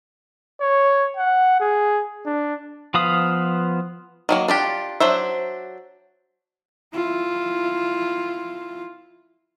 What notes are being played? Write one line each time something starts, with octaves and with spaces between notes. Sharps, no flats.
C#5
F#5
G#4
D4
F3 B3 B4 F5 D#6
D#3 F#3 A#3
D4 F4 G4
F#3 D4 C5 E5
E4 F4